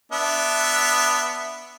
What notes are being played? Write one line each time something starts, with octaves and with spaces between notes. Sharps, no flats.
B3 D4 E5